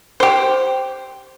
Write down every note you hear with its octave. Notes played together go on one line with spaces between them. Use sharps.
G4 C5